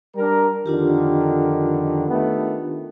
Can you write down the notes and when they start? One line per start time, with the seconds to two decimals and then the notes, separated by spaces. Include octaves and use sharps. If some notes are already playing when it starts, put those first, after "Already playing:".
0.15 G3 D4 A#4
0.66 F2 D3 D#3 D4 F4 G4
2.08 D#3 A3 B3